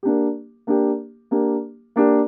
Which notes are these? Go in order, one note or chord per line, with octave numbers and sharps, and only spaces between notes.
A#3 D4 G4
A#3 D4 G4
A#3 D4 G4
A#3 D4 G4